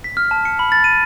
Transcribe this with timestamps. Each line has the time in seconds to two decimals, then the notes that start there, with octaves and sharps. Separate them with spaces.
0.04 B6
0.17 F6
0.31 A5
0.45 C#7
0.59 B5
0.72 A6
0.84 D#7